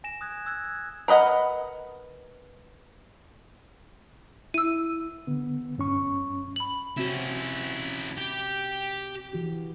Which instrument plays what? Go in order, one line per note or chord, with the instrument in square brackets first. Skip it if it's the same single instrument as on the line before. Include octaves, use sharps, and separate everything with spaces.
[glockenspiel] G#5 A#6 E7
D#6 F#6 G#6
E6 F#6 G#6
[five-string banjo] A#4 B4 D#5 F#5
[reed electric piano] E4 [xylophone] E6 D#7
[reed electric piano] D3 B3
G2 C#4 C#6
[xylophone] B5 F#7
[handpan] C3 C4 F#4 [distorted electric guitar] C#4 E4
[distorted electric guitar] G4
[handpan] E3 F#4 G4